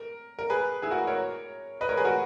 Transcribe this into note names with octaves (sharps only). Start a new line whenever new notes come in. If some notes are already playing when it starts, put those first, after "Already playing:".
Already playing: A#4
A#4
G#4 B4
E4 G#4
F#4 A#4
A#4 C#5
B4 D#5
A#4 C#5
G#4 B4
F#4 A#4